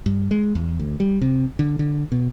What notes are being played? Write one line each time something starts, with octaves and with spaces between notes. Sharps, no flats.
G2
G#3
E2
D2
G3
C3
D3
D3
B2